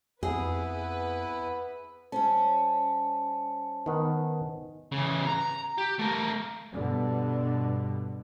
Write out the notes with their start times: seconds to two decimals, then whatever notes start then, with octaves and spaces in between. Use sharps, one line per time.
0.23 F2 B3 E4 G#4 B4
2.12 G3 C#4 C5 A5
3.86 D#3 B3
4.92 C#3 E3
5.27 A#5
5.78 G4
5.99 A3 A#4
6.72 G2 B2 D3